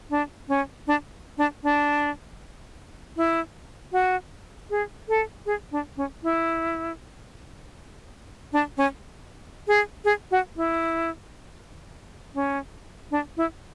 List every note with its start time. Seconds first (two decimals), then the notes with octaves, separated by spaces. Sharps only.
0.10 D4
0.49 C#4
0.87 D4
1.38 D4
1.64 D4
3.17 E4
3.93 F#4
4.70 G#4
5.09 A4
5.46 G#4
5.72 D4
5.97 C#4
6.23 E4
8.53 D4
8.78 C#4
9.68 G#4
10.05 G#4
10.31 F#4
10.57 E4
12.35 C#4
13.11 D4
13.37 E4